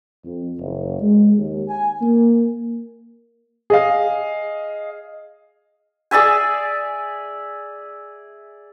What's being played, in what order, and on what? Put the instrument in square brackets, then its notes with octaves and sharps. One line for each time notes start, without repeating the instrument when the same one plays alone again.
[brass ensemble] F2
F#1
G#3
D#2
G#5
A#3
[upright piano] G#4 D#5 F5
[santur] G#4 D5 E5 G#5